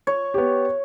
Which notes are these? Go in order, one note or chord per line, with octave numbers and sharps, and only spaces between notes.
C#5
B3 G4